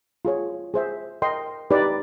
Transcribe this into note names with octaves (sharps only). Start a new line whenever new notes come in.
F4 G#4 C#5
G#4 C5 E5
A#4 D#5 G5 C6
D#4 G4 B4 D5